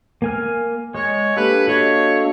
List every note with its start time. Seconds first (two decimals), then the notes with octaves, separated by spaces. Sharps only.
0.22 A#3 G#5 F6
0.95 G#3 C#5
1.37 A#3 D4 G4 A4 B4
1.68 F#4 C#5 D#5 F5